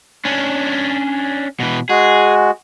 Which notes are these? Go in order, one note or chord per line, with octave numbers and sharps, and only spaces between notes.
C#4 D4
B2 E3
G#3 F#4 G#4